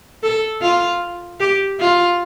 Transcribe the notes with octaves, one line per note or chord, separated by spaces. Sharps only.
A4
F4
G4
F4